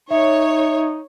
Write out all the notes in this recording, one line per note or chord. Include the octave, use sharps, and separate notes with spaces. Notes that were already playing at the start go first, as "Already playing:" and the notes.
D#4 C#5 E5